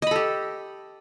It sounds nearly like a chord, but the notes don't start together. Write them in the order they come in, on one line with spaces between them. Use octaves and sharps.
D#5 B5 A4 G4